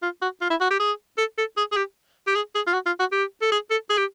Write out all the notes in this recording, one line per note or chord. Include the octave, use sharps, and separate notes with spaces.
F4
F#4
F4
E4
F#4
G4
G#4
A4
A4
G#4
G#4
G4
G4
G#4
G#4
F4
F#4
F4
F#4
G4
A4
G#4
A4
G#4
G4